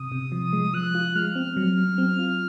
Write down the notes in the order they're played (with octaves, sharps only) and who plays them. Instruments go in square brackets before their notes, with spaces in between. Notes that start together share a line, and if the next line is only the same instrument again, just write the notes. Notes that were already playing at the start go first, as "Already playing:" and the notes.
Already playing: [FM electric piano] C3 [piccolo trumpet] D#6
[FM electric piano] C3
F3
G#3
[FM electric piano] F3 [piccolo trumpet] F#6
[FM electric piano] F4
[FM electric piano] G#3 [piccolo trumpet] F6
[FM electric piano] C4
F#3
F#3
C4
F4